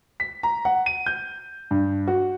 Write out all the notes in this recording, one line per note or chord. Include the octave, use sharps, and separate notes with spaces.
B6
A#5
F#5
D#7
G6
G2
F#4